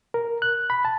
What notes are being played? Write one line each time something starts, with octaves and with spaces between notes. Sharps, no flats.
A#4
F#6
B5
A5